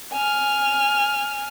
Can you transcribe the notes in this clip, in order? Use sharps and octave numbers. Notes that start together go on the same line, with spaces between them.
G#5 F6